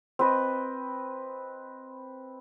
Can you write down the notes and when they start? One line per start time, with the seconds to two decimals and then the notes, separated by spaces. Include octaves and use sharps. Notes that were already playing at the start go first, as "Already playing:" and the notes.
0.19 C4 B4 D#5